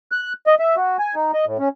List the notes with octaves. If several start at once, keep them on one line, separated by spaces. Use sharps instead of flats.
F#6
D#5
E5
F#4
G#5
D#4
D#5
A2
C#4